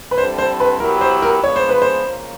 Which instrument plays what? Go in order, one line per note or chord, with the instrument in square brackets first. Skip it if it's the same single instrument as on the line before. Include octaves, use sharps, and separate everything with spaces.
[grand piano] B4
[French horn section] D3 G3 C4 E4 A4 [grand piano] C5
[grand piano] C5
B4
[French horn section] F#3 B3 E4 G4 [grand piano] A#4
[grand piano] C5
A#4
[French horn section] C#3 F3 G#3 B3 D4 [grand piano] C#5
[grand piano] C5
B4
C5
[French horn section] C#3 F3 A#3 C#4